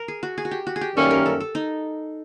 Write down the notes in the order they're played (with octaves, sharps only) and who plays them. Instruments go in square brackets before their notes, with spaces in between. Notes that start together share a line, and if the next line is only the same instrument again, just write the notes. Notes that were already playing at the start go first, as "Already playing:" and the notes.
Already playing: [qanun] A#4
G#4
F#4
G#4
F#4
G4
F#4
G#4
G4
[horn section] F#2 D#3 G3 A#3 C#4 [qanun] A4
[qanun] A#4
A4
A4
D#4